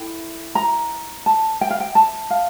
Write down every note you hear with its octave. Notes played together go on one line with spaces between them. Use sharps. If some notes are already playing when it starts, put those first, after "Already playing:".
Already playing: E4 A4 G5
A#5
A5
G5
F5
G5
A5
F5